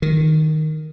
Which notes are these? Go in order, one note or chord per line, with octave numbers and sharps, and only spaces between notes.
D#3